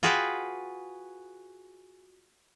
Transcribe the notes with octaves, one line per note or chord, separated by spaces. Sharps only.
F4 F#4 G#4 B4 F5 G5